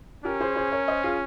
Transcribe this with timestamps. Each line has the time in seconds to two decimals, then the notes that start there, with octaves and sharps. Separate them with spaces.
0.24 C#4 G4 A#4
0.40 G#4 C5
0.56 G#4 C5
0.72 A#4 C#5
0.88 C5 D#5
1.03 F4 G#4